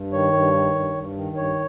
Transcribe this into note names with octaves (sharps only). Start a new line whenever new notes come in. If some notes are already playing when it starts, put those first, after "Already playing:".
Already playing: G2
D#3 C#5
G2
D#3
G2
G2
D#3
G2 C#5